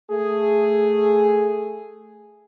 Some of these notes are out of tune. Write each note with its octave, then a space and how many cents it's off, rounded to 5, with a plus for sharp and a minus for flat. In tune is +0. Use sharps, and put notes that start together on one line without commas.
A3 +0 G#4 +0